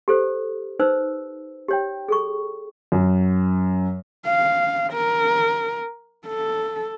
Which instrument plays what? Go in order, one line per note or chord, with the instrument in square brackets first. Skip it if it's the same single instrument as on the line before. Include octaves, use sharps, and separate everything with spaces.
[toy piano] G4 A4 C5
D#4 B4 C5 E6
G4 C#5 G5
G#4 A4 C#6
[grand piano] F#2
[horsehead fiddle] F5
A#4
A4